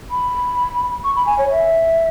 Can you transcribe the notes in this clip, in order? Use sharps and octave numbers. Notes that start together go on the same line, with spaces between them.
B5
C#6
B5
G#5
C#5
E5